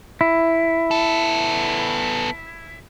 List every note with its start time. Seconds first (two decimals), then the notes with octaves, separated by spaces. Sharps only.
0.21 E4
0.91 B3 A4